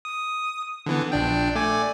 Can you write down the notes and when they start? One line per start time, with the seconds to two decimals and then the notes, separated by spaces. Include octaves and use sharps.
0.05 D#6
0.86 D3 E3 B3
1.12 A#1 D4 G5
1.55 A3 D5 G#5